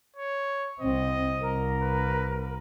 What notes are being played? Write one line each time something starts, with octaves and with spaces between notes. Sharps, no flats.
C#5
C2 C4 D#5
C2 A#4
B4